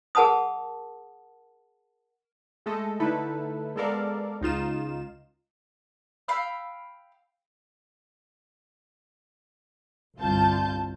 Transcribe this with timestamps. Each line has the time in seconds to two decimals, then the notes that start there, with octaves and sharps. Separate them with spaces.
0.15 G#4 A#4 F#5 A5 B5 D#6
2.66 G#3 A3 A4 D#5
3.00 D3 A3 D#4 E4 A4 B4
3.76 G#3 B3 A4 A#4 D5 F5
4.41 C#2 D#4 F4 E7
6.28 F5 G5 B5 E6
10.19 G1 C2 F4 A5 G6